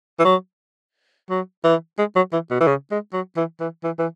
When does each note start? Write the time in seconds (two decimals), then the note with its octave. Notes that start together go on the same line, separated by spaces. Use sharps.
0.19 E3
0.25 F#3
1.30 F#3
1.64 E3
1.98 G#3
2.16 F#3
2.33 E3
2.51 B2
2.60 E3
2.67 C#3
2.91 G#3
3.13 F#3
3.37 E3
3.60 E3
3.83 E3
3.98 E3